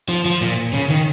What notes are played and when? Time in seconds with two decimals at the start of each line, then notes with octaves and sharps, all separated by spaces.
0.09 F3
0.25 F3
0.41 A#2
0.73 C#3
0.90 D#3